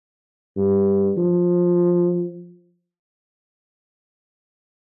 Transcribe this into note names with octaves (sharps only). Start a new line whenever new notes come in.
G2
F3